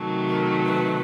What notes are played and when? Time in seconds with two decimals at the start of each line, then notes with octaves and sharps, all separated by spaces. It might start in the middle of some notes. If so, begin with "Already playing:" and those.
Already playing: C3 D#3 F#3 A3
0.29 A#4
0.65 B4